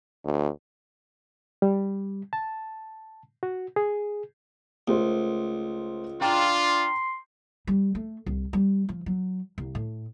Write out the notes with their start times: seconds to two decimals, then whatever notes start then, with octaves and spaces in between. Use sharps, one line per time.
0.24 D2
1.62 G3
2.33 A5
3.43 F#4
3.76 G#4
4.88 C#2 A3 A#4 C5
6.21 D4 F4 G5 A#5 C6
7.67 G3
7.95 A3
8.26 C2
8.53 G3
8.89 F3
9.06 F#3
9.58 C2
9.75 A2